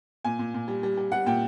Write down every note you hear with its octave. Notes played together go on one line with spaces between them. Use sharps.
A#2 G#5
A#2
A#2
G3
G3
G3
G3 F#5
A#2 G5